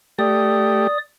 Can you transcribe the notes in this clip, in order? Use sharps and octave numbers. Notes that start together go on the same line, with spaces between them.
A3 G4 D5 D#6